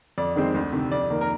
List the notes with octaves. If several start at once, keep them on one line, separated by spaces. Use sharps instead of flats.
F2 D5
D#3 G#3 C4
D2
C3 D#3
F2 D5
D#3 A#3
A#4